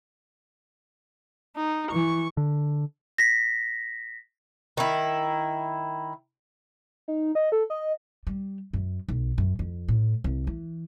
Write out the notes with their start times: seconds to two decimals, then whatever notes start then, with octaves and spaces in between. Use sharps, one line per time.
1.56 D#4
1.92 E3 C#6
2.37 D3
3.18 A#6 B6
4.77 D#3 E4
7.08 D#4
7.35 D#5
7.52 A4
7.70 D#5
8.27 G3
8.73 F#2
9.09 B1
9.38 F#2
9.59 F2
9.88 A2
10.24 C2
10.47 E3